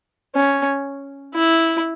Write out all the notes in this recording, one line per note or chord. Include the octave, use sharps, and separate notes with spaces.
C#4
E4